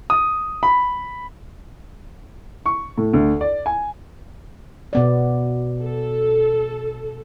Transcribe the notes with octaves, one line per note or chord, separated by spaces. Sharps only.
D#6
B5
C#6
A2
D2
D5
G#5
B2 B3 D5
A4